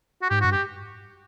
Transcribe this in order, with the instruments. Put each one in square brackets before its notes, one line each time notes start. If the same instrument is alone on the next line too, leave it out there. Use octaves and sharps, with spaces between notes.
[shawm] F#4
[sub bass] G#2 [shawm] G4
[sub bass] G2 [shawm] F#4
[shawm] G4